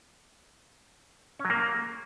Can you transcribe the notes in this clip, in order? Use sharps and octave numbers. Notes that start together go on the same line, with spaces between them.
C#4
F#3
A#3